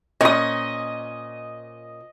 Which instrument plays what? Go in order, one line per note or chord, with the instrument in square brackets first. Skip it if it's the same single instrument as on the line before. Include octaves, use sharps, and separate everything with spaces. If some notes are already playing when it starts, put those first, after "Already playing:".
[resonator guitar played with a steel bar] A#2 C#4 [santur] D#5 D#6